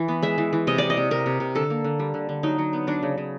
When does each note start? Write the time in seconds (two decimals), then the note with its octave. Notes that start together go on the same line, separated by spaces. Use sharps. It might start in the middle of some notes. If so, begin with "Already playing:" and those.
Already playing: E3
0.08 B3
0.23 G#3 E5
0.38 E3
0.53 E3
0.67 C3 D#5
0.78 C3 D5
0.90 D#5
0.97 C3
1.11 C3 A#4
1.26 C3
1.40 C3
1.55 D3 A4
1.70 A#3
1.84 D3
1.99 G3
2.14 D3
2.29 D3
2.43 F#3 D#4
2.58 F#3
2.73 B3
2.87 F#3 D4
3.03 C#3
3.17 C#3